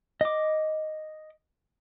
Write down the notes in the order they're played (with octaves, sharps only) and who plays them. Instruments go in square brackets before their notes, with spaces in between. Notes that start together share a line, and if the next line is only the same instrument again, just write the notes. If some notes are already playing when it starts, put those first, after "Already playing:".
[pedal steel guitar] D#5 D6